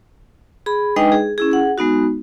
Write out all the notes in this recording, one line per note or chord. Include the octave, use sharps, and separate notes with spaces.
G#4 B5
G#3 D4 D#4 B4 D#5 G5
G#4
C#4 E4 G#4
G#4 F#5
G#3 B3 D#4 F#4